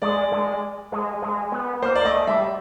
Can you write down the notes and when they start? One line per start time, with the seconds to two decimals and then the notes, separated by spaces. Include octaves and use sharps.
0.02 G#3 D5
0.32 G#3
0.92 G#3
1.22 G#3
1.52 B3
1.82 A#3 C5
1.95 D5
2.05 A3 D#5
2.27 G3 E5